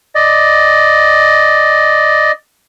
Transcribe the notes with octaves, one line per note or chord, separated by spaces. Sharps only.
D5 D#5